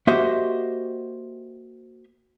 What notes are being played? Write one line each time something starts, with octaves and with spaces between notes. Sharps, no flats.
A#3 F#4 G4 C5 D#5 E5